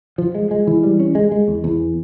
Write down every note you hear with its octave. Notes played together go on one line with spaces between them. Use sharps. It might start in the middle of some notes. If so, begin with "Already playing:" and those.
F3
G#3
G#3
E3
G3
C#4
G#3
G#3
E2
E2